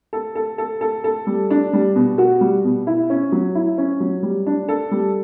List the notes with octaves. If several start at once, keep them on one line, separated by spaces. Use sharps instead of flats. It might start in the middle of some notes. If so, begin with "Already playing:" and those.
A4
A4
A4
A4
A4
G3
D4
G3
B2
F#4
G3
B2
E4
C#4
F#3
E4
C#4
F#3
G3
D4
A4
G3